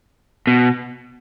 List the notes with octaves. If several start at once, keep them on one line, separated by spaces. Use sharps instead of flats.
B2